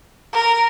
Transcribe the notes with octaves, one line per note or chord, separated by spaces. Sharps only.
A#4